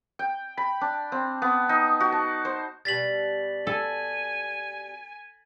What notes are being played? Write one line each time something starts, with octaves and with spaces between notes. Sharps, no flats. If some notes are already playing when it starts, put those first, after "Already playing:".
G5
B5
D4
C4
B3
D#4
F#4
A5
C5
B2 G3 A6 B6 F#7
A4 G#5